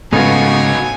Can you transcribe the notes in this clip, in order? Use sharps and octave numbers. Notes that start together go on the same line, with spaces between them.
G#2 C#3 A3 B3 D#4 F4 F#4 G#5